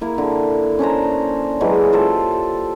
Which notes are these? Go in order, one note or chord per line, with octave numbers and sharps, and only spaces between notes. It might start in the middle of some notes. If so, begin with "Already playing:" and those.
A#3 E4
D3
C#4 D4 C5 A#5
C#3 E3 F#3 G#3
F4 G4 A4 C5